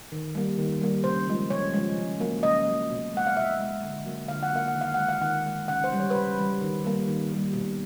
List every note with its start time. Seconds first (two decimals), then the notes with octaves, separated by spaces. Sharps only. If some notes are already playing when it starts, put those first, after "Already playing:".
0.12 D#3
0.35 G3 A#3
0.59 D#3
0.81 G3 A#3
1.04 C#3 C5
1.28 F3 G#3
1.50 C#3 C#5
1.74 F3 G#3
1.98 C#3
2.20 F#3 A#3
2.43 C#3 D#5
2.66 F#3 A#3
2.90 B2
3.14 G#3 F#5
3.27 F5
3.36 B2 E5
3.60 G#3
3.83 D3
4.06 F#3 A#3
4.28 D3 F5
4.43 F#5
4.52 F#3 A#3 F5
4.68 F#5
4.75 D#3
4.81 F5
4.94 G#3 F#5
5.09 F5
5.21 D#3 F#5
5.45 G#3
5.68 C#3 F#5
5.84 C5
5.92 E3 G3
6.00 C#5
6.10 B4
6.14 C#3 C5
6.37 E3 G3
6.61 D#3
6.84 G3 A#3
7.08 D#3
7.31 G3 A#3
7.53 B2